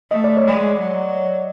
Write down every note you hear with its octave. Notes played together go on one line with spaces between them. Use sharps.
A3 D#5
D5
C#5
G#3
D5
F#3